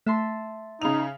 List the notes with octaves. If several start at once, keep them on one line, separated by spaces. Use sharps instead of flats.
A3 E5 A5 C6
C#3 D#4 F7